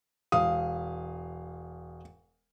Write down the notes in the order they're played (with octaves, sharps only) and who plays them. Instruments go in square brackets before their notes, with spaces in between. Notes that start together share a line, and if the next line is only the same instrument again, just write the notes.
[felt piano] E1 F5 D#6